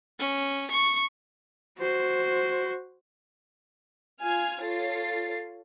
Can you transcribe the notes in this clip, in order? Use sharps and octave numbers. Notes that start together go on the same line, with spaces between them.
C#4
C#6
F#4 C5
F4 G#5 F6 G#6
F4 A4 C#5 A6 C7